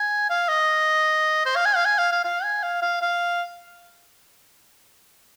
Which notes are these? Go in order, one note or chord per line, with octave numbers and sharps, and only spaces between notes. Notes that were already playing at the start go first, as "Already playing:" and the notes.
Already playing: G#5
F5
D#5
C5
F5
G#5
F5
G#5
F5
F5
F5
G#5
F5
F5
F5